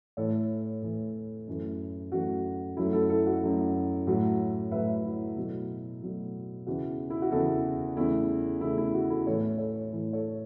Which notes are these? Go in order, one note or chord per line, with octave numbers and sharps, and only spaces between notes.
A2 E3 A3 A4 C#5
A2 E3 A3
F#2 E3 A3
F#2 E3 A3 F#4
F#2 F#3 A3 E4
E4 A4
E4 A4
F#4
F#2 F#3 A3
A2 F#3 A3 F#4
A2 F#3 A3 B4 E5
E4
B2 F#3 A3
B2 F#3 A3
E2 C#3 E3 F#4
E4
F#4
E2 C#3 E3 E4 A4
E2 C#3 A3 E4
E2 C#3 A3 E4
E4
F#4
E4 A4
A2 E3 A3 A4 C#5
A4 C#5
A2 E3 A3
A4 C#5